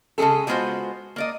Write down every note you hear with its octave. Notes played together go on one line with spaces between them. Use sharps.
C#3 G#3 C4 G#4 A4
G3 G#3 B3 F4 F#4 C5
A#3 D5 D#5